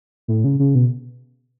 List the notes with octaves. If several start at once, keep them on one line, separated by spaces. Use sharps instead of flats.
A2
C#3
C#3
B2